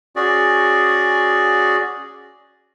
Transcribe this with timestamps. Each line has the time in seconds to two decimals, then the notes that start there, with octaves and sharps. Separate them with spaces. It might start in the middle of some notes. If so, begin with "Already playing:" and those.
0.16 C#4 F#4 G#4 D5